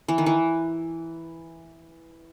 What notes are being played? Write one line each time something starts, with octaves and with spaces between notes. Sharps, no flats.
E3
D#3
E3